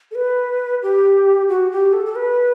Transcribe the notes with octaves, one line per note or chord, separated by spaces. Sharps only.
A4
B4
G4
F#4
G4
A4
A4
B4